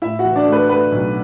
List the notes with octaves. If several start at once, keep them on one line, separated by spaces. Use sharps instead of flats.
A2 E4 E5
F#4 F#5
E3
D4 D5
A3
B4
A3 B4
B1